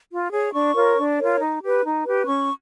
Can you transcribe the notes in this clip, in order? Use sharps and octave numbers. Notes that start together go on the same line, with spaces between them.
F4
G#4 C#5
D4 C#6
F4 A#4 C#5
D4
F4 A#4 C#5
D#4
G4 B4
D#4
G4 B4
C#4 C#6